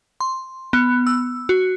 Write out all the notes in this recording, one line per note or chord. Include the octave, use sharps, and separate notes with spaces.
C6
B3
E6
F#4